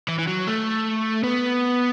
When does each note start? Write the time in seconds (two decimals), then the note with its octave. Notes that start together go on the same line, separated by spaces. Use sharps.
0.09 E3
0.19 E3
0.28 F#3
0.48 A3
1.24 B3